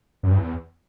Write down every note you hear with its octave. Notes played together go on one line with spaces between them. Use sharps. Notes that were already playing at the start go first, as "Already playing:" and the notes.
F#2
G2
E2